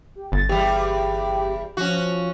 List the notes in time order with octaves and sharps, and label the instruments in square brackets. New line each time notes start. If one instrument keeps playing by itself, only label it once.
[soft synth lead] G4
[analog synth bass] G1 [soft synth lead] A6
[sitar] E2 G3 [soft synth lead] G4
[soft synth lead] F3 [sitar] C#4 F#4